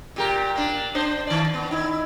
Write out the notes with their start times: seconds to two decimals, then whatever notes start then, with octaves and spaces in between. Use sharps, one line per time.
0.16 A#2 G4 A#4
0.55 A#3 D4
0.95 D4 C5
1.27 D#3 D5
1.54 B3
1.71 D#4 E4